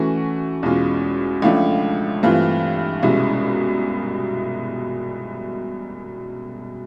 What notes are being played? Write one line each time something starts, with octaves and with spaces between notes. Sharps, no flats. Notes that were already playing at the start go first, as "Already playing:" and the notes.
Already playing: E3 A3 C#4 F#4
E2 B2 G#3 C#4 F4
C#2 C#3 F3 A3 D4
G2 E3 A3 C4 F4
C2 B2 G#3 C#4 E4